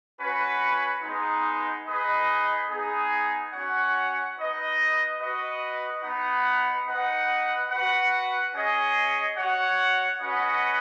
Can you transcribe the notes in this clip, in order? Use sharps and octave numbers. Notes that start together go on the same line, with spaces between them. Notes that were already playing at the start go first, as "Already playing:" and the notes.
C#4 F#4 B4
G#3 B3 D#4
D#4 G#4 B4 D#5
B3 D#4 G#4
C#4 F#4 C#5 F#5
D#4 B4 D#5
F#4 B4 D#5
B3 D#4 B4 F#5
D#4 B4 F#5
F#4 B4 F#5
C#4 G#4 D#5
F#4 C#5 F#5
C#4 F#4 B4 D#5 F#5